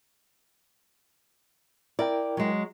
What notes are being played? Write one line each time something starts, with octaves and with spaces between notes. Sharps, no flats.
E4 A#4 D5 G5
F#3 G#3